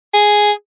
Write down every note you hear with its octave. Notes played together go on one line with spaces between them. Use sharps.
G#4